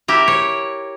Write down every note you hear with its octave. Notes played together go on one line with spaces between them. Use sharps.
E4 G4 A#4
C#5